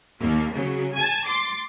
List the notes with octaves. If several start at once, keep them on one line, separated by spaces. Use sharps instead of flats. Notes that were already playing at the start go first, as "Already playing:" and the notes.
D#2 A#3
C#3 F#3
G#5 A5
C6 D6 A6